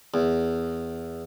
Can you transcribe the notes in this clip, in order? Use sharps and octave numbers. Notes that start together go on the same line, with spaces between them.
E2